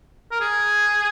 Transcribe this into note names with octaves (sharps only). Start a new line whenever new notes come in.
A#4
G#4